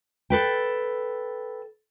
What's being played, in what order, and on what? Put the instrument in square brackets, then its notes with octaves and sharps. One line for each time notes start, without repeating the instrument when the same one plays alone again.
[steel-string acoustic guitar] A4 B4 G5